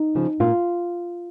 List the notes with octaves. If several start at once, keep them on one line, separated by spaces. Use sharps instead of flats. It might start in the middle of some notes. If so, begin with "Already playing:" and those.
Already playing: D#4
C#3 F3
A#2 F4